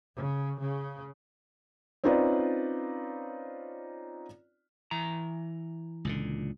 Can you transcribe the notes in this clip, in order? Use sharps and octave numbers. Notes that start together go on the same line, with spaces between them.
C#3
C#3
C4 C#4 D#4 F4 B4 D5
E3 A#5
C#2 A#2 D3